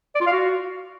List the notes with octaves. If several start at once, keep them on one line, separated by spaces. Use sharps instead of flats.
D5
F4
F5
F#4